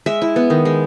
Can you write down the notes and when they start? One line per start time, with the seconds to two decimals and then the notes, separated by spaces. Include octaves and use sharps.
0.06 G#3 E5
0.22 E4
0.36 B3
0.50 D#3
0.65 G#3